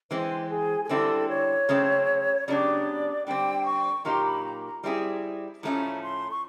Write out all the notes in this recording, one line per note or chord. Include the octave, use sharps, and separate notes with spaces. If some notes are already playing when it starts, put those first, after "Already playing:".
E3 G#3 C4 C5
G#4
G#4
D3 G3 C4 E4 A4
C#5
C#3 F#3 A3 C4
C#3 F#3 B3 D4 G4 D5
D3 G3 C4 G5
C#6
A#2 F#3 A#3 D#4 G4 C6
B5
A#5
A#5
G3 C4 E4 G#4
A2 F3 A3 C#4 E4 A#5
C6
C#6